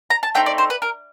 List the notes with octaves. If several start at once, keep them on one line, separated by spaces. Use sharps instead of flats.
A#5
A5
A3 C4 D#4 G5
D5
C5
B4
A#4